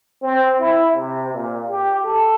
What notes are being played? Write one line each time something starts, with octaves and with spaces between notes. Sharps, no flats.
C4
E4
C3
A#2
G4
A4